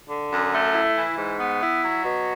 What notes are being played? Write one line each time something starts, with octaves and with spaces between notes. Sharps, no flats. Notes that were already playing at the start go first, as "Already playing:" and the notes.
D3
F#2
A3
E4
E3
G#2
B3
E4
F#3
B2